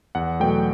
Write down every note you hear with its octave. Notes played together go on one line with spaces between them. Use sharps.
E2 F#5
B2 F#3 A3 G5